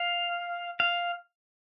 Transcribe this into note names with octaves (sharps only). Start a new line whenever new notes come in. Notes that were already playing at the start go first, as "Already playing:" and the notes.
Already playing: F5
F5